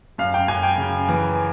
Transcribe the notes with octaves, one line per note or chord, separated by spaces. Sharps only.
F#2 F5
G5
F#2 G#5
G5
C#3
E3